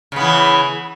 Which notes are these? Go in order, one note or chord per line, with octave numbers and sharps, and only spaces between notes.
C#3 E3 B3